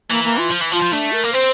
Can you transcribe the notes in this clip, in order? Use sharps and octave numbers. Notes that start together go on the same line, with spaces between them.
E3 A#3
A#3
F4
F3
E3
F3 F4
F3
A3 D4
A#4
A#3
C4 C5